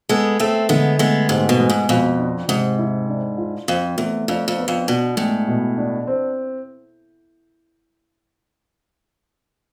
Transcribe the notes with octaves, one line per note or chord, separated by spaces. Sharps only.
G#3 B3 A4
A3 C4 A4
D3 G#3 B3
G#3 A3 B3
G#2 C3
B2
G#3
G#2
F2 B2
D4
G#2 C3
E4
D4
F4
F2 C4
E2 A3
F2 D4
F2
B3
F2
B2 D4
A2 G#3
B2
D4
C4